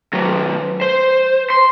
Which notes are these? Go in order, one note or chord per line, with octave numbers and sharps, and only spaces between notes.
D#3 F#3
C5
C6